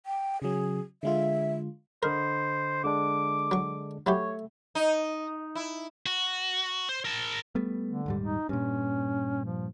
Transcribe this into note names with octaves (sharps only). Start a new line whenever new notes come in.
G5
C#3 F#3 G#4
D3 G#3 F4 E5
D3 A#4 C5 D#5 B5
D3 G#3 D4 D6
F#3 C#6
F#3 A3 E4 G4 C#5
D#4
E4
F#4
C5
A#4 A5
G3 A3 B3
D3
D#1 G#2 G3
D#4
G2 A#2 C#4
F3